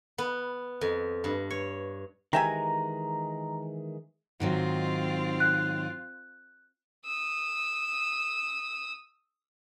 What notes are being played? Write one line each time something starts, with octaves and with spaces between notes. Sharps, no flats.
B3
F2
G2
C#5
D#3 E3 G#3 G4 E5 G#5 A#5
G#2 D#3 F#3 C4 F4
F#6
D#6 E6